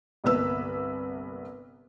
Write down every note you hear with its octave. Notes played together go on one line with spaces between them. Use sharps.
G1 C2 A#3 B4 E6